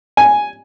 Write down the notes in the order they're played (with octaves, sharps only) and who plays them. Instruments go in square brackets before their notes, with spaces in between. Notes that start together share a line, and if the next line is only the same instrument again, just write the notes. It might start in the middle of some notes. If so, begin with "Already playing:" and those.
[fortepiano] G#5